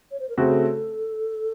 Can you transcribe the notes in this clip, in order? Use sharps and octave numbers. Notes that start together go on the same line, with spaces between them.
C#5
C5
A#4
C#3 A3 C4 F#4 A4